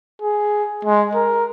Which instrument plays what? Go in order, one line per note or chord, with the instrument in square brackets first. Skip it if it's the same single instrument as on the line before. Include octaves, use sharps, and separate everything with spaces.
[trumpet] G#4
G#3
A#4